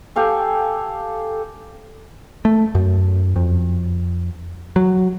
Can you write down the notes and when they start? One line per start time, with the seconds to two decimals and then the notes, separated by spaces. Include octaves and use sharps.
0.16 G4 A4 F5 G#5
2.45 A3
2.75 F#2
3.36 F2
4.76 F#3